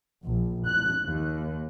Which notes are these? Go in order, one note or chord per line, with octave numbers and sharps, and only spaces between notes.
A#1
F#6
D#2